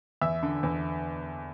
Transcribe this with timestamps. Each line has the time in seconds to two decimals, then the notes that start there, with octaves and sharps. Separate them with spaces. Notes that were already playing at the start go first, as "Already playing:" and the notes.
0.21 E2 E5 E6
0.43 D3
0.63 E2